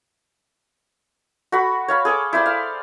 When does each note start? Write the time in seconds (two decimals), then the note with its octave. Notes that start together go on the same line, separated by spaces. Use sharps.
1.52 F#4 A4 B5
1.88 C#5 F5 B5
2.05 G#4 A4 C#6 D6
2.33 E4 C5 D5 C6
2.46 F5